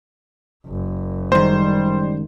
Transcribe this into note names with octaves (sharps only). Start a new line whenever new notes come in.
F#1
C#2 D#3 G3 C5